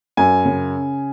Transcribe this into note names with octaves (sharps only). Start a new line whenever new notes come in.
F#2 G#5
C#3